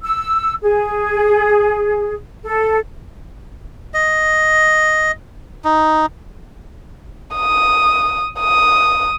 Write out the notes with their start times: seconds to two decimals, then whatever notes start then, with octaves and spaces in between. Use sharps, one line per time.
0.03 E6
0.62 G#4
2.43 A4
3.94 D#5
5.65 D#4
7.36 D#6
8.40 D#6